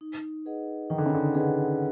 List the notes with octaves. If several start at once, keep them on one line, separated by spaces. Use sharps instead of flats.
D#4
G#4 B4 D#5 F#5
D#3 D#4
D3
C#3
D3
C#3 G#4 B4 D#5 F#5